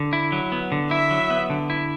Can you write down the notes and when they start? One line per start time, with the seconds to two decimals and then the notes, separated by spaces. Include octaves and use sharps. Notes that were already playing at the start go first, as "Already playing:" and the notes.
Already playing: D3
0.13 E4
0.32 F#3
0.52 B3
0.72 D3
0.91 E4 E5
1.11 F#3
1.30 B3
1.50 D3
1.70 E4